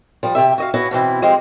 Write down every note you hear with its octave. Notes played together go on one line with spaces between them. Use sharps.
F3 G3
C3 G4 E5
F#4 D#5 F5
B3 C#4 E4 F#4
B2 E3 C4 E4
F3 G#3 C4 G4